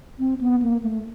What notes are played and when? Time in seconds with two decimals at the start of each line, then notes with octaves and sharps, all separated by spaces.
0.20 C4
0.41 B3
0.62 A#3
0.83 A3